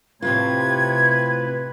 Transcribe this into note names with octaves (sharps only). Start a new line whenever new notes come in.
A2 C3 C4 F4 B4 G#6